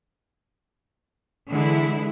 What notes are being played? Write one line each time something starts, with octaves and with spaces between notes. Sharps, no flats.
D3 E3 G#3 E4